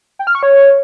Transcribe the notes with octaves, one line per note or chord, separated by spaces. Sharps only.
G5
F6
C#6
C#5